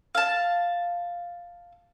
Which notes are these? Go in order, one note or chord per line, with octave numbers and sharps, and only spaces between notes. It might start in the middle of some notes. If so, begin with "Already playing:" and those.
F5 A5